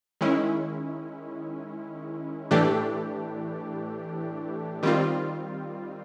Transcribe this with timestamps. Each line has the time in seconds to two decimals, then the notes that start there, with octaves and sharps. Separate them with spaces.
0.21 D#3 G#3 C#4 E4
2.51 A2 E3 A3 D4 G4
4.83 D#3 G3 C4 F4